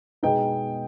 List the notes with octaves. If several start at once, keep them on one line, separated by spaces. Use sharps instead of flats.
B2 G#3 B3 D#4 G5